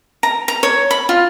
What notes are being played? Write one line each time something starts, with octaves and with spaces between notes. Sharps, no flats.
A#5
A#5
C#5
B5
F4